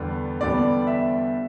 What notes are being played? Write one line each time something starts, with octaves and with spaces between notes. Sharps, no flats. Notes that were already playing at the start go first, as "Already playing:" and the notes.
Already playing: E2 D3 G3 B3
E2 D3 G3 B3 D5
E5